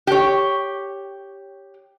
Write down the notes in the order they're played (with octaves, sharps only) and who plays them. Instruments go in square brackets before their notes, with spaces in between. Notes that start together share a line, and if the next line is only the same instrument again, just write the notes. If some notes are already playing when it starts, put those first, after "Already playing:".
[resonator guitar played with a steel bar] G4 C#5